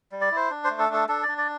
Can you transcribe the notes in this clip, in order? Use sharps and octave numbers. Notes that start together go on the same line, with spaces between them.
G3
D5
E4 C5
D4
C5
A3
A4
D4 A4
D4 A4
D5
D4
D5